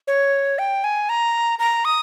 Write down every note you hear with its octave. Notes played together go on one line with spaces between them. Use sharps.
C#5
G5
G#5
A#5
A#5
D#6